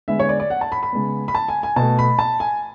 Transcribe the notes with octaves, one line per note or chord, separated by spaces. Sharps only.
D3 G#3 B3 E5
C#5
D5
D5
F#5
A5
B5
B5
C#3 G#3 B3
B5
A5
G#5
G#5
B2 A3 A5
B5
A5
G#5